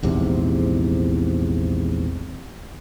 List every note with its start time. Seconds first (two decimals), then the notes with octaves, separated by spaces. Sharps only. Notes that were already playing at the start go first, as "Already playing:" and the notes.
0.03 A#1 E2 G#2 C3